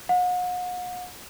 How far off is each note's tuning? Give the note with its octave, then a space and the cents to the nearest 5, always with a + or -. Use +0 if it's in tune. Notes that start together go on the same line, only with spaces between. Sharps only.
F#5 -40